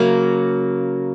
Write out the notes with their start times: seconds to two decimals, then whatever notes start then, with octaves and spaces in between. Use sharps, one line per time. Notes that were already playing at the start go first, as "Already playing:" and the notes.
Already playing: C#3 F#3 A#3